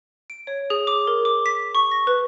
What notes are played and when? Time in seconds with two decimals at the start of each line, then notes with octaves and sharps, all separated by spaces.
0.30 D7
0.47 C#5
0.70 G#4
0.87 D6
1.07 A#4
1.25 D6
1.46 B6
1.75 C#6
1.91 A#6
2.07 B4